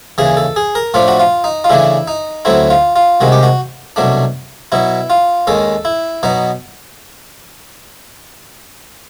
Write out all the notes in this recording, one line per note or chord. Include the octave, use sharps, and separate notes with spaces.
D#2 C#3 E3 G#4
A4
G#4
A#4
A2 F3 A3 D4 F4
F#4
F4
D#4
F4
C#3 E3 A3 D4 E4
D#4
D2 D3 F#3 A3 C4 E4
F4
F4
C2 C3 D#3 G#3 F#4
G4
F#4
C2 B2 F#3 A3 D4
B2 F#3 B3 E4
F4
D#2 D#3 G#3 C#4 A4
E4
B2 F#3 B3 D#4